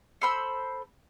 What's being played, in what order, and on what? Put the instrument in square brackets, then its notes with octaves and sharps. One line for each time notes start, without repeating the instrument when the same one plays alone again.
[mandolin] A4 C5 B5 E6